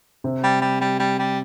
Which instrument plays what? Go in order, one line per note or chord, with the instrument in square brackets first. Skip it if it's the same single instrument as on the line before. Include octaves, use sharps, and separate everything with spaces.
[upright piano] C3 C4
[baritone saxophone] G3
G3
G3
G3
G3